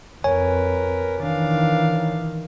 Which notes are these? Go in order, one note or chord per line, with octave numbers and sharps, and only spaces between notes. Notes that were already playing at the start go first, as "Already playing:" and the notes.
F2 A#4 B4 C#5 G#5
D#3 E3 D4 F5